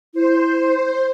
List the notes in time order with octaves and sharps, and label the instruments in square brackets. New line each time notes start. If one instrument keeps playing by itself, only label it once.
[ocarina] E4 [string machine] C5